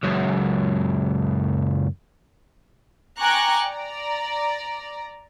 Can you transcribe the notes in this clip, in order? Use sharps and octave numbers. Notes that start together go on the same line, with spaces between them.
C#2 F#2
G5 G#5 A#5 C#6 D6 F#6
D5 A#5